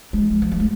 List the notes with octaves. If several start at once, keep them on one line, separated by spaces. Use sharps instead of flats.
G#3
F3
G#3
F3
G#3
A3